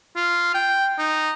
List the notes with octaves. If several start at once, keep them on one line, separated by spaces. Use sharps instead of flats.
F4
G5
D#4